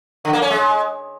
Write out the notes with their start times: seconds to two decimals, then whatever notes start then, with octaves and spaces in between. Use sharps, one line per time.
0.25 D3
0.33 A#3
0.42 C#4
0.50 G#3